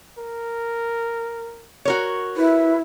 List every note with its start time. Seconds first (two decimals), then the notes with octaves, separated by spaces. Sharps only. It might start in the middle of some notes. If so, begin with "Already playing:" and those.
0.18 A#4
1.85 F#4 A#4 C#5
2.37 E4 B4